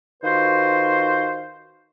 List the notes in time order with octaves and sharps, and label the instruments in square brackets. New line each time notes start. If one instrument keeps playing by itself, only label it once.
[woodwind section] D#3 F4 F#4 B4 C5